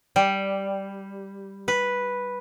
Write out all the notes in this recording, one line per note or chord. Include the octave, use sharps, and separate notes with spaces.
G3
B4